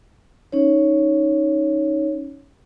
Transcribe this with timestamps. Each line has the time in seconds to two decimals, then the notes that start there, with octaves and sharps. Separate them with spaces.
0.52 C#4 D#4 C#5